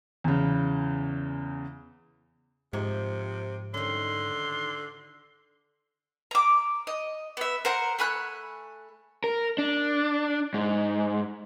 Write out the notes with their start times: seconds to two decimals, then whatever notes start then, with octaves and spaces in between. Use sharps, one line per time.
0.24 E2 C#3
2.73 G#2 C3 F3
3.74 D3 D#3 C#4 C6
6.31 A#5 D6
6.87 D#5
7.37 B3 E5
7.65 A#4 C5 F#5 A#5
7.99 A3 G#5 B5 F#6
9.24 A#4
9.58 D4
10.54 G#2